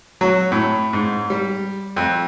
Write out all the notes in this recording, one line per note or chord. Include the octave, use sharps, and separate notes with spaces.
F#3
A2
G#2
G3
F2